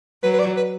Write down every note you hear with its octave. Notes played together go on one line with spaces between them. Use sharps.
F#3 B4
B4
D5
B4